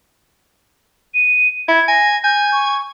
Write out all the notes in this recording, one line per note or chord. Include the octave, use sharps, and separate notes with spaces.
D#7
E4 G#6
G#5 A#6
G#5 G6
C#6